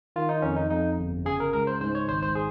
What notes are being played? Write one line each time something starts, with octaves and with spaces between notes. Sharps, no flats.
D#3 F4
D#4
F2 C#4
D#4
F2 D#4
G1
C#3 G#4
A#4
C#2 A#4
C5
G#2 C5
C#5
G#1 C5
C5
G#4